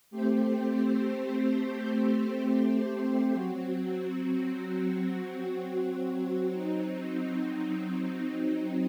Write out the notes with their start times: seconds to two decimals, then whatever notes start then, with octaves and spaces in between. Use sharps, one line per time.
0.11 A3 C4 G4 C5
3.32 F#3 C4 F#4
6.53 F#3 C4 D#4